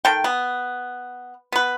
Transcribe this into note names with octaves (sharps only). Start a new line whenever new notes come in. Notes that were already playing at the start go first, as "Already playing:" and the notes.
D#3 A4 G5
B3
B3 B4